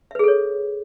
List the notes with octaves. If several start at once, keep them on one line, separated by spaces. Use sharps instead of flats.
G#4 A4 B4 C#5 E5